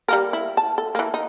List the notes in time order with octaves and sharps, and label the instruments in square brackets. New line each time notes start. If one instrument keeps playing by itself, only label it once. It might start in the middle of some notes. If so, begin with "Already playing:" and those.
[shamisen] G3 A#3 A#4
E4
A5
A4
E3 A#3
D#4